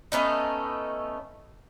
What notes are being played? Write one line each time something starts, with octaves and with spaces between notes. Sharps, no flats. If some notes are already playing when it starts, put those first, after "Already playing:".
A3 B3 C#4 D#4